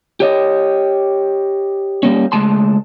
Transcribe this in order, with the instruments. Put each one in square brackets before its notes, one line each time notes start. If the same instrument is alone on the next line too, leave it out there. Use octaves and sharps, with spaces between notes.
[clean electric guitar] G4 C#5 D#5
G3 A#3 C#4
C#2 G#3 A3 A5 C6